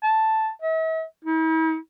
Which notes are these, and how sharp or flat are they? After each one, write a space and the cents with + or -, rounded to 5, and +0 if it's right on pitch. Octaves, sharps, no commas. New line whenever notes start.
A5 +0
E5 -45
E4 -45